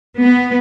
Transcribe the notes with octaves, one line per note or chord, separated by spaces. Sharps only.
B3